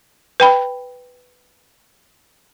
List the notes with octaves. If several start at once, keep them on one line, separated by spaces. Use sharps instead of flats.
B4 G5 B5